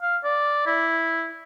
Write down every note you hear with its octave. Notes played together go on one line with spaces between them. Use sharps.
F5
D5
E4